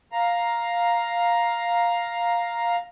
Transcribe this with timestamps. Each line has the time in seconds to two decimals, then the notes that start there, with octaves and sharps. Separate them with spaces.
0.12 F5 A#5